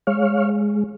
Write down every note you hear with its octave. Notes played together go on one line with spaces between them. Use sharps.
G#3 C#5 F5